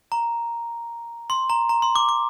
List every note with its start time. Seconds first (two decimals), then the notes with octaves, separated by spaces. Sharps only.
0.12 A#5
1.30 C6
1.50 A#5
1.69 A#5
1.82 C6
1.96 D6
2.09 D6